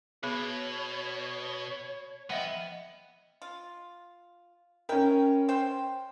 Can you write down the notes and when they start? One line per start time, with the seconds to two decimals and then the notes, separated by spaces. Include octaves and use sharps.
0.23 B2 B3 G#4 C#5 B5
2.30 F3 B3 D#5 E5 F#5 G5
3.42 F4
4.89 C#4 E4 A#4 G5
5.49 C5 G5